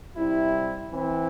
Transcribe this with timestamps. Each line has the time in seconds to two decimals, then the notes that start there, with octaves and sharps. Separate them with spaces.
0.16 C3 G3 E4
0.91 E3 C4 E4